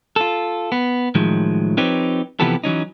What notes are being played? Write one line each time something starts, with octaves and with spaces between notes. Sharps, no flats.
F4 A4
B3
A2 D#3 F3 F#3 G#3
F3 C4 D#4 G4 B4 C#5
C3 E3 F3 B3 G4 A4
E3 F#3 C#4 D#4